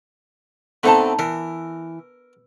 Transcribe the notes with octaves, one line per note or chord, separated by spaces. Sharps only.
D3 A3 B3 C4 D#4 A5
E3 A#4